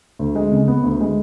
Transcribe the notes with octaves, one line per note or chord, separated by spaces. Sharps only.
D2
G#3
C#3
B3
D2
G#3